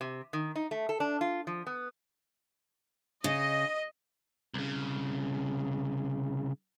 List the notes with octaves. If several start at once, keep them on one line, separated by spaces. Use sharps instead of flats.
C3
D#3
D#4
A3
A4
D4
F4
F3
B3
C#3 D#5
C2 C#3